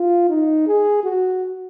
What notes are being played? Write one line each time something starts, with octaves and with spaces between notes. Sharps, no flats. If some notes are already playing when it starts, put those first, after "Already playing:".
Already playing: F4
D#4
G#4
F#4